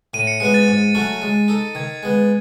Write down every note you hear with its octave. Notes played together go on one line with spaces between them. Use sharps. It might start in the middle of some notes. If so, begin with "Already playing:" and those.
A2 D#7
C#7
G#3 B3 F#4 C#7
A6
G#2
F#3 A3 C#4 F#4
G#3
D#4 A4
D#3 G#6
G#3 B3